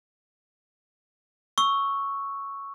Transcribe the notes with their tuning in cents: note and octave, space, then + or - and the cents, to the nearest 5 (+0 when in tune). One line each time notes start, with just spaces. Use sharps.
C#6 +0 E6 +0